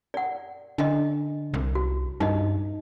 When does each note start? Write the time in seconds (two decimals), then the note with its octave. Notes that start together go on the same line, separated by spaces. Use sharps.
0.14 D5 F#5
0.78 D3 D4 D#5
1.54 C2
1.75 F#4
2.20 G2 D#4 D#5